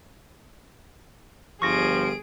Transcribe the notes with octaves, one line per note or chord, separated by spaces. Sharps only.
G1 F3 G4 G#4 C#6 A#6 D7